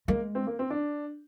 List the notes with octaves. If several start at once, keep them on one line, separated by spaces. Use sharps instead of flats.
G#3 A#3
C4
A#3
C4
D4